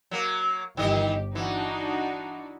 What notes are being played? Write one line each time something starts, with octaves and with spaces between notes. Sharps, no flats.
F#3 A#3
G1 D#3 E3 G4 D#5
E3 D4 D#4 F#4